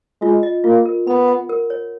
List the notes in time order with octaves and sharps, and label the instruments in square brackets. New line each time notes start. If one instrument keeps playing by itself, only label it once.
[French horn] G#3 [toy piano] F4
[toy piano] D#5
[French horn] A#3 [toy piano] F4
[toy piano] A#4
[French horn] B3 [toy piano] B5
[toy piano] F#5
A#4
C#5